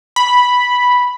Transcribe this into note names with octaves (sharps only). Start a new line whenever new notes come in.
B5